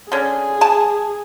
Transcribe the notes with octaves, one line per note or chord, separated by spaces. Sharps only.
D3 C#4 G#4
G#5 A5